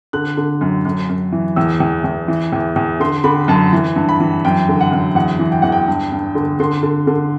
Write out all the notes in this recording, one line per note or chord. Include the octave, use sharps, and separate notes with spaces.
D3 F#6
D3
F#2
F#2
F#2
E3
E2 E6
E2
E2
E3
E2
E2
D3 C6
D3 B5
F#2 A5
E3
G2
B5
E3
F#2 G5
D3
F#5
F#2
E2 F#5
E3
G5
E2 F#5
G5
G2
G2
D3
D3 C6
D3
D3